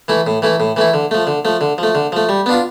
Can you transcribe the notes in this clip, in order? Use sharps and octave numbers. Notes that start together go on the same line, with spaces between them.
E3 A3 E4
A2
E3 A3 E4
A2
E3 A3 E4
D3
F3 A3
D3
F3 A3
D3
F3
A3
D3
F3 A3
G3
B3 D4 F4